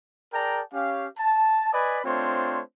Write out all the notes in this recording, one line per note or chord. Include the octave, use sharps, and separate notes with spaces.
G#4 A#4 D5 G5 A5 A#5
C#4 G4 F5
A5
B4 D5 D#5 G#5 B5
A3 C4 D4 F4 C5 C#5